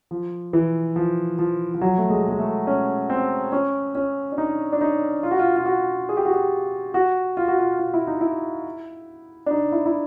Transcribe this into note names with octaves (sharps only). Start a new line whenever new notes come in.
F3
E3
F3
F3
F3
F#3
A3
G#3
G#3
A3
C#4
C4
C#4
C#4
D4
D#4
D4
D#4
F4
F#4
F4
F4
F#4
G#4
G4
F#4
G4
F#4
F4
F#4
F4
F4
E4
D#4
E4
D4
D#4
E4
E4